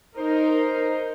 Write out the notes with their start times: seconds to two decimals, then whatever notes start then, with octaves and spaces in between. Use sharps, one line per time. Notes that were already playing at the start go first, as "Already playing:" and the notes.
0.17 D#4 A#4 C5